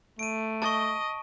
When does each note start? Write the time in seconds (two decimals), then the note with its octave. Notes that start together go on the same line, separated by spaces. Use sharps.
0.19 A3 D7 D#7
0.62 D#5 A5 C#6